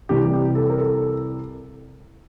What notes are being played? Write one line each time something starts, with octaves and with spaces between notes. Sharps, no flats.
C2 C3 E3 G3 G4
G4
A4
A#4
A4